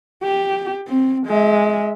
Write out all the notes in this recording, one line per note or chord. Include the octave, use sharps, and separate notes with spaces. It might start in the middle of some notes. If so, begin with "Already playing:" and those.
G4
C4
G#3 E5